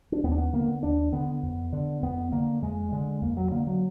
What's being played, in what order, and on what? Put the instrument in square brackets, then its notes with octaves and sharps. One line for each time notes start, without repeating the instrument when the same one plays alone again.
[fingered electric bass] D4
D#2 B3
D4
B3
D3 A#3
B3
D#2 D4
D3 B3
F2
D3
F2 B3
D3 A#3
F2 G#3
D3 G#3
F2 A#3
F#3
D3 A#3
F#3